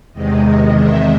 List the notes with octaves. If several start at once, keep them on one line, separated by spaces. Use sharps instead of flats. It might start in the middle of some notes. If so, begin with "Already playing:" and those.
E2 C3 D#3 G#3 D#5
E5